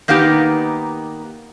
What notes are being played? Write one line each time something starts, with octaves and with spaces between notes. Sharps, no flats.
D#3 A#3 B3 D#4 G4